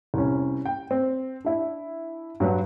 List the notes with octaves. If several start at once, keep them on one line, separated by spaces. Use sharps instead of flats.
C2 C#4
G5
C4
D4 E4
G2 F#3 B4 F#5